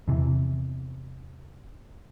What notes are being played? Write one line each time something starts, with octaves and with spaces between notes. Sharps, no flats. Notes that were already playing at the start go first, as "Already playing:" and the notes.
E2 C3 E3